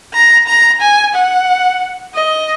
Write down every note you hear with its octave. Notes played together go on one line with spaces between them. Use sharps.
A#5
A#5
G#5
F#5
D#5